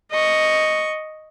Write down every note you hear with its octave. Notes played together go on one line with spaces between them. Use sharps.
D#5 C#6